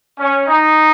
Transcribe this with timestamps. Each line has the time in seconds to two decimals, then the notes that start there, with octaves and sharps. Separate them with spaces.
0.18 C#4
0.47 D#4